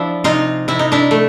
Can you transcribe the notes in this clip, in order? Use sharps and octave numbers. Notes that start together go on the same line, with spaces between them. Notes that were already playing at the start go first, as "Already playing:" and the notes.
Already playing: F3 D4 E4
C3 D#4 F4
C3 E4
D#4
D4 E4
A3